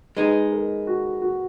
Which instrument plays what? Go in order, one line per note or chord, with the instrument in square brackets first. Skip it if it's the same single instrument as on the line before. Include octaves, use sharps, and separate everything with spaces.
[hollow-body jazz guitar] G#3 D#4 G#4 [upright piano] B4
[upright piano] A#4
F#4
F#4